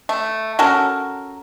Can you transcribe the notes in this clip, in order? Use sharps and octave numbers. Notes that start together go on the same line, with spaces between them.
A3
C#4 F#4 A4 A#4